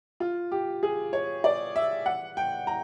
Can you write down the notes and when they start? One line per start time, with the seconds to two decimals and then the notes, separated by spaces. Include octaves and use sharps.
0.20 F4
0.52 G4
0.83 G#4
1.13 C#5
1.44 D5
1.76 E5
2.06 F#5
2.37 G5
2.67 A#5